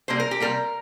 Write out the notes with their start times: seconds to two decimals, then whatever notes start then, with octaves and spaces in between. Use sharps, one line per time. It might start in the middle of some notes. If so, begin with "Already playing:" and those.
0.08 C3 G3 A#3 C5
0.20 A#4
0.31 G4
0.40 C3 G3 A#3 A#4